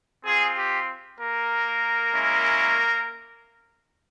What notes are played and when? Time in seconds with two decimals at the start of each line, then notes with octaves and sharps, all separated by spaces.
0.25 C4 F4 G#4
0.56 G4
1.19 A#3 A#4
2.13 G#3 C#4 E4